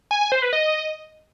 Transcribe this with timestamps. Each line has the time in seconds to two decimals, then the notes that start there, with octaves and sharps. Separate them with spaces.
0.11 G#5
0.21 G#5
0.32 C5
0.42 B4
0.53 D#5